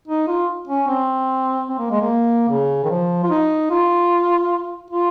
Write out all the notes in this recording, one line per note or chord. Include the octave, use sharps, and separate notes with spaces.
D#4
F4
C#4
C4
C4
A#3
G#3
A#3
C#3
D#3
F3
F4
D#4
F4
F4